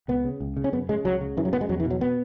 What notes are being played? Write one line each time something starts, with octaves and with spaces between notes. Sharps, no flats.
C#2 B3
C#3
C#2
C#3
C#4
F#2 B3
C#3 G#3
C#2 F#3
C#3
F#2 E3
F#3
C#3 B3
G#3
E2 F#3
E3
B2
F#3
B3